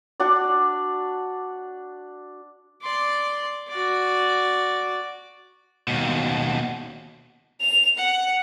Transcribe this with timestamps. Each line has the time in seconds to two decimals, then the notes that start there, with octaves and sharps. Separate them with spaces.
0.20 D4 F#4 D5
2.82 D5 C6
3.68 F#4 D5
5.88 D#2 B2
7.61 F7
7.98 F#5